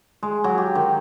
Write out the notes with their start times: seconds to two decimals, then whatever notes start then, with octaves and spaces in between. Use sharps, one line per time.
0.23 G#3
0.44 F#3
0.58 G4
0.75 D#3